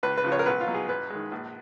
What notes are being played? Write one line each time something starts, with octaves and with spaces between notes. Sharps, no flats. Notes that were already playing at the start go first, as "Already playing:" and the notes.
C#2 B4
B4
C#3 F3
C#5
A#4
B1 B4
F4
B2 F#3
G#4
F#2 B4
D#3 G#3
A#1